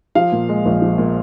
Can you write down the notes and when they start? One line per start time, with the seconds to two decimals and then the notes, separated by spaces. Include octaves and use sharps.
0.15 F3 F5
0.32 A#2
0.49 G#3
0.65 A#1
0.82 F3
0.98 A#2